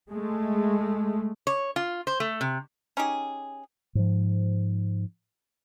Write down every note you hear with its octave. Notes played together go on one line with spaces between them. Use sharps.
G#3 A3
C#5
F4
C5
A3
C3
C#4 D#4 G4 G#4
G#2 F3